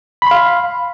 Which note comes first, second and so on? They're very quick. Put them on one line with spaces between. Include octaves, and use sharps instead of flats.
B5 C6 F5